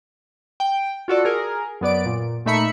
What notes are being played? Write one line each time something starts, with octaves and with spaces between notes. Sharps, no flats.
G5
F4 F#4 A4 D5
G#4 A#4
F#2 B3 D5 D7
A#2
A#2 A3 D#4 E5 B5 C#7